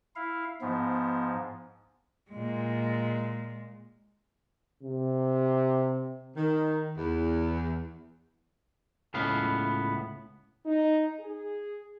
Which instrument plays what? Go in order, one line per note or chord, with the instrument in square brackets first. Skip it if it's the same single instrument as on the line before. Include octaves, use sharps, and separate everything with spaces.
[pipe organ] E4 F5
[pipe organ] G#2 F3 [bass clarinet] B3
[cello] A#2 G#3
[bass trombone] C3
[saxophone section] D#3
E2
[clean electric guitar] C#2 A2 B3 F5
[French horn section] D#4
G#4